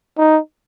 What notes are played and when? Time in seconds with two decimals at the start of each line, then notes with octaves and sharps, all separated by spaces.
0.18 D#4